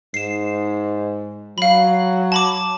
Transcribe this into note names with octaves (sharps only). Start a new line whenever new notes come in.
G#2 C7 E7
F#3 F5 B5
A5 B5 D6